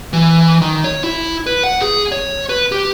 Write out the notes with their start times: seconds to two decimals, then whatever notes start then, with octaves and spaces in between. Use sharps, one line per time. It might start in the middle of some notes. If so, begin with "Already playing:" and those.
0.13 E3
0.62 D#3
0.84 C#5
1.04 E4
1.46 B4
1.64 F#5
1.81 G#4
2.12 C#5
2.49 B4
2.72 G4